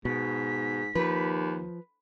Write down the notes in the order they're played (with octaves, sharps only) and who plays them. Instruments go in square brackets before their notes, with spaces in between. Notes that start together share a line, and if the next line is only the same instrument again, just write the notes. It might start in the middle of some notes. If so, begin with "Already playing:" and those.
[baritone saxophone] G#2 [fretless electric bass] B2 [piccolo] B6
[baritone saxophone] D#2 [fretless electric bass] F3 [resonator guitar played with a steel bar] B4